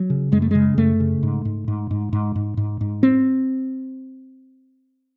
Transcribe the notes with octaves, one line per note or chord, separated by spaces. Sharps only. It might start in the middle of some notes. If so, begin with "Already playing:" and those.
Already playing: F#3
C#3
F#2 G#3
A3
C#3 G#3
F#2 A3
C#3
G#2
G#2
G#2
G#2
G#2
G#2
G#2
G#2
C4